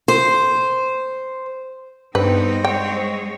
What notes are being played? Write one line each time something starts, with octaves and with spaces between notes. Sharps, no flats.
C5
G2 B3 C4 D#4 B4
G#3 C#5 G5